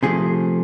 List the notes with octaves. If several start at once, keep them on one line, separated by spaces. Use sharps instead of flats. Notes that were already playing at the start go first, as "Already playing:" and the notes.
C3 F3 A3 G#4